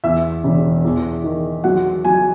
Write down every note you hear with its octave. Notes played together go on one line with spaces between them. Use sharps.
E2 E5
E1
E2
D#3
F#3 F#5
F#3 G#5